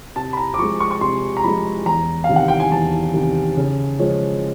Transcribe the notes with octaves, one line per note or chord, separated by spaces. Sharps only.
C3 A5
B5
A#5
D6
F3 G#3 C#6
C#6
C#6
C3 C6
A#5
F3 G#3 B5
E2 A#5
F5
C3 D#3
F#5
G5
G#5
E2 A5
C3 D#3
C#3
F3 G#3 C#4